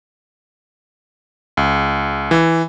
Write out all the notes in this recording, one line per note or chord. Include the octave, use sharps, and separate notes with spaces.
C#2
E3